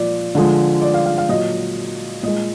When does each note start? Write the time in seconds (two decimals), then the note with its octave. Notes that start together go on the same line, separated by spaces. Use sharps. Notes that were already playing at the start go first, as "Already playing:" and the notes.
Already playing: A#2 F3 D5
0.35 D3 F3 G#3
0.82 D5
0.94 F5
1.06 F5
1.18 F5
1.29 A#2 F#3 D#5
2.23 A#2 G#3 D#5